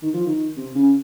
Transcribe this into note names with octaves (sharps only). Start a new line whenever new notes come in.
D#3
F3
D#3
C3
C#3